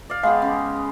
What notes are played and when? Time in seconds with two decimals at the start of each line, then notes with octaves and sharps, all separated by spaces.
0.10 D5 F5
0.23 G#3 B3 G4 F5
0.42 C#3